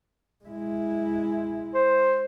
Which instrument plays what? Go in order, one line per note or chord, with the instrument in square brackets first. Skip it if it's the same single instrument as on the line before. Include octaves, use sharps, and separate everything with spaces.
[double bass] G#3 E4
[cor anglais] C5